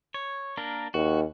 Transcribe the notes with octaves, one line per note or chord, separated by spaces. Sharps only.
C#5
A#3 D4 A#4
D#2 F#4